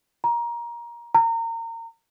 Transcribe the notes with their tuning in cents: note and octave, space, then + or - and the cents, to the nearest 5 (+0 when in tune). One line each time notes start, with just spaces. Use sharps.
A#5 +20
A#5 -30